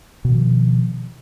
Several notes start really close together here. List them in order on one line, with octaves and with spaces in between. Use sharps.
B2 D#3 F3